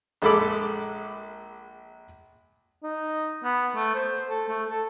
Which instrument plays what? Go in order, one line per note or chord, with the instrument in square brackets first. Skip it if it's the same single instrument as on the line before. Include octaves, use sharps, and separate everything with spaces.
[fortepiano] A#1 G#3 A4 B5 D6
[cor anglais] D#4
B3
A3
C5
A4
A3
A4